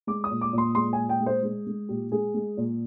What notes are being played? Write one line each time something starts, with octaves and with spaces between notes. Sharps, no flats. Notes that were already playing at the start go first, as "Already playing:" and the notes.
G#3 D6
D#6
A#2
D6
A#2 C6
G#3 C6
G#5
A#2
G5
G#3
C5
G#3
G#3
A#2 G4
G#3 G#4
G#3
A#2